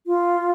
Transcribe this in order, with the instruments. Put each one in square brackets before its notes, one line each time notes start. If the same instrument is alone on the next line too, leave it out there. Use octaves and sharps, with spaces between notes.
[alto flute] F4